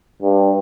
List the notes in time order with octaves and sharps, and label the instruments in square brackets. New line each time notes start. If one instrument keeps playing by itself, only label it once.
[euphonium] G2